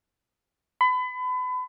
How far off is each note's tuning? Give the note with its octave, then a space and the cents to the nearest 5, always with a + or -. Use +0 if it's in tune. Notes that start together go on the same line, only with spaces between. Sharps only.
B5 +30